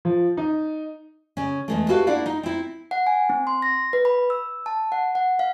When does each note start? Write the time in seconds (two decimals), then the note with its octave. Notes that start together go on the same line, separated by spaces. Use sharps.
0.05 F3
0.37 D#4
1.37 C#3 C#4
1.68 E2 G#3 A3
1.89 E4 F#4 G4 A4 B4 F5
2.07 A#3 D4 E4 D5 F5 F#5
2.26 D#4
2.43 C4 E4
2.91 F#5
3.07 G#5
3.30 C4
3.47 C6
3.62 A#6
3.93 B4
4.05 B5
4.30 E6
4.66 A5
4.92 F#5
5.15 F#5
5.39 F5